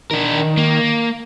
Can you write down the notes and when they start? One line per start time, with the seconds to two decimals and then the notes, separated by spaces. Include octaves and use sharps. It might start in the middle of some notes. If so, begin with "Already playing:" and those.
0.11 D#3 D4 A#4
0.57 A#3